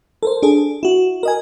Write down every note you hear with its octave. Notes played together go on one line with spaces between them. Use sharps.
A4 A#4 C5
D4 G#4 A4
E4 F#4
A#4 D#5 G#5